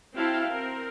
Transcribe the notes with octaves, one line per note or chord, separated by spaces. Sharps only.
C4 E4 F#4 F5 G5 A5
C4 A#4